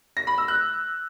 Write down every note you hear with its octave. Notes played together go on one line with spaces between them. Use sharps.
A#6
B5
E6
F#6